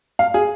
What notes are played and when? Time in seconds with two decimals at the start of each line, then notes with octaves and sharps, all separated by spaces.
0.19 F5
0.34 G#4